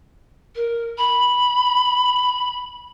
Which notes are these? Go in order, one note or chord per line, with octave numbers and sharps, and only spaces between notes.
A#4
B5